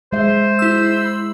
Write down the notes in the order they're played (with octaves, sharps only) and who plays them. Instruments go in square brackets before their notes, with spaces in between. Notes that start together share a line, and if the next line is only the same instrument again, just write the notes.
[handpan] G#3 E5 [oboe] C5
[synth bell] E4 E6